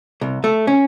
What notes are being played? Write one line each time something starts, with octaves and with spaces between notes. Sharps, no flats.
C2
A3
C#4